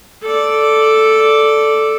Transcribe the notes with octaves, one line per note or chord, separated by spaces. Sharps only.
A4 D5